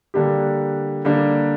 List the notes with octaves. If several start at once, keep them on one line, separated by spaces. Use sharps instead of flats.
D3 G3 A#3 D4 G4
D3 G3 A#3 D4 G4